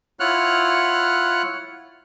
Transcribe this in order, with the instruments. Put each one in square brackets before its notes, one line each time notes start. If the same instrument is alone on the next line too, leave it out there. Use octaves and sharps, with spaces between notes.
[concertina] E4 F4 C#5 F#5 F6 F#6